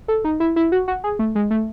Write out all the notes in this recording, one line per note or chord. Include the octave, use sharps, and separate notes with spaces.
A4
D#4
E4
E4
F#4
F#4
G#4
A3
G#3
A3